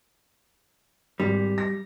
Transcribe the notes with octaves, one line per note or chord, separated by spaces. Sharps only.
G#1 G3
A#6